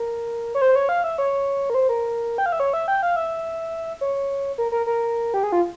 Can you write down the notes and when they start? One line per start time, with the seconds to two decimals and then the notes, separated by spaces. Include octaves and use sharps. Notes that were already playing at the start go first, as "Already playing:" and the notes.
Already playing: A#4
0.55 C#5
0.62 C5
0.75 C#5
0.89 F5
1.04 E5
1.18 C#5
1.70 A#4
1.74 C5
1.89 A#4
2.38 G5
2.46 F5
2.52 E5
2.60 C#5
2.73 E5
2.88 G5
3.03 F5
3.16 E5
4.01 C#5
4.58 A#4
4.72 A#4
4.86 A#4
5.34 G4
5.43 G#4
5.52 F4